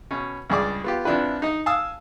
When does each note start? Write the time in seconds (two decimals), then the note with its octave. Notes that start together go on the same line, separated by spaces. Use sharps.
0.11 B2 C#4
0.50 C#2 G2 G#4 D5 D6
0.84 B3 F4 G4
1.05 C3 F3 D4 E4 B4
1.42 D#4 D#5
1.66 F5 G#5 A5 D#6 E6